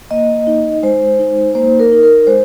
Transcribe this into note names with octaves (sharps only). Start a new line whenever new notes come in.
A#3 D#5
D#4
G#3 C5
D#4
A#3 C5
A#4
D#4
A#4
G#3 C5